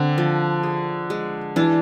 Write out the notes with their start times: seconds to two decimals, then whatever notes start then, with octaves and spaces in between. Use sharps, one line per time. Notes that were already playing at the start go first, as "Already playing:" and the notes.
Already playing: D3 C4
0.18 F3
0.63 G#4
1.10 G#3
1.56 E3 D4